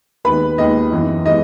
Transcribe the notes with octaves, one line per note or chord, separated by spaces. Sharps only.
D#2 D#3 G#3 B3 B4 B5
D#2 D#3 G#3 B3 D#5
F#2 E3 G#3 B3
E3 G#3 B3 D#5